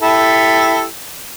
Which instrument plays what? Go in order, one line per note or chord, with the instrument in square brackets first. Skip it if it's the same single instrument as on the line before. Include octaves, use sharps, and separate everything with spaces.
[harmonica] E4 G4 A4